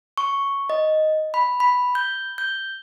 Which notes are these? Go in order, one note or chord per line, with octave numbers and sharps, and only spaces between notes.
C#6
D#5
B5
B5
G6
G6